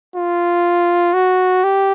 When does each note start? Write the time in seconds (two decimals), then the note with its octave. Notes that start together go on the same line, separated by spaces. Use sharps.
0.15 F4
1.14 F#4
1.64 G4